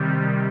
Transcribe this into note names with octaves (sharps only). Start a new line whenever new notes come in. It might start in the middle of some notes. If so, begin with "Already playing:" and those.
Already playing: C3 D#3 G3